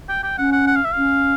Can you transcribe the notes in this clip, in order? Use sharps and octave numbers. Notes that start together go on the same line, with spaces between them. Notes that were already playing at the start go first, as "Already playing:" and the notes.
G5
G5
C#4 F#5
F#5
F#5
F5
E5
C#4 F5